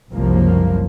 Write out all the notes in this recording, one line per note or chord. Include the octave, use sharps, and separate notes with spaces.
F#1 C2 F#2 F3 A#3